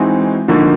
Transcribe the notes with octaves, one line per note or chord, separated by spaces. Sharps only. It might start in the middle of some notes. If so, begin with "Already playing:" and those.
Already playing: E3 G#3 C4 D#4 F#4
D3 F3 A#3 D#4 F#4